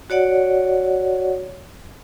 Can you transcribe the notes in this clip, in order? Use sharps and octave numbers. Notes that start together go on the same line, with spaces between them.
F#4 C#5 D5 F#5